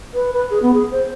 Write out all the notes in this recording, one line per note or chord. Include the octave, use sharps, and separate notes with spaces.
B4
B4
G#4
B3
G#4
C5